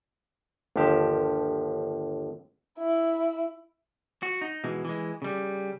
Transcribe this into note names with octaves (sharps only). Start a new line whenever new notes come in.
G1 D#2 D3 F3 G4 A5
E4
F#4
D#4
B2 E3 G#3
E3 G#3
C#3 G3